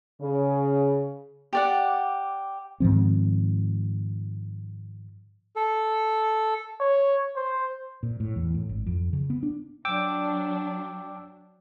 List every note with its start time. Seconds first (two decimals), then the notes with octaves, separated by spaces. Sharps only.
0.22 C#3
1.53 G4 D5 F#5
2.80 G#2 D#3 F3 C4
5.56 A4
6.80 C#5
7.36 C5
8.03 A#2
8.20 A2
8.36 E2
8.54 A2
8.69 G#1
8.86 F2
9.13 C#3
9.30 B3
9.43 D4
9.85 F#3 D4 G5 D6 E6